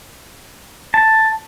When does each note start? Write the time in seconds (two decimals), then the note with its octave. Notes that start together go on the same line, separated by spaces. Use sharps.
0.94 A5